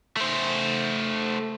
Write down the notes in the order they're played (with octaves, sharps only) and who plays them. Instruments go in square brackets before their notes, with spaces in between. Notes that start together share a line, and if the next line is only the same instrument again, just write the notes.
[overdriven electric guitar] A3 C5